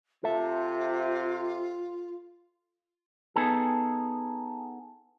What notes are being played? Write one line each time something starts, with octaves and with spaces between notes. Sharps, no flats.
C3 F4 A4 E5
B3 D#4 G#4 A4